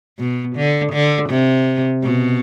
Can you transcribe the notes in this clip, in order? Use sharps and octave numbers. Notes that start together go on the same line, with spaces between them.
B2
D3
D3
C3
B2